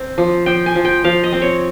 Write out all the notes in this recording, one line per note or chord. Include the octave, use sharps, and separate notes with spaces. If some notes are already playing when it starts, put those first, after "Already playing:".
Already playing: C4
F3
F3 G5
G#5
F3
G5
F3 F5
D#5
C4
C#5